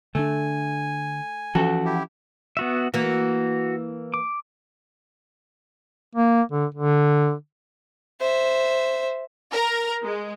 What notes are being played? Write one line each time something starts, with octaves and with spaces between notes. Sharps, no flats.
D3 A3 D4 G#5
E3 F3 C#4 F#4 A4
E4 G4
B3 F#4 E5
E3 A#3 F#4
D6
A#3
D3
D3
C5 E5
A#4
G#3